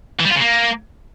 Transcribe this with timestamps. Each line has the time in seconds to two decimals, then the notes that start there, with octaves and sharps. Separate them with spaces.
0.20 E3
0.25 G3
0.30 F4
0.35 C#3
0.41 A#3